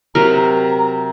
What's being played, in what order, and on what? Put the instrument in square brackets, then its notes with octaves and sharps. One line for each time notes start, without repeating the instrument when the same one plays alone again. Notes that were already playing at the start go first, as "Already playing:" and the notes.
[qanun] C3 F#3 A#4 [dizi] A#5